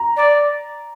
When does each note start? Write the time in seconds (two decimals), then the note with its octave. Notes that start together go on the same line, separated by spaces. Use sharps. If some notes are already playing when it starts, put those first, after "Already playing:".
Already playing: A#5
0.16 D5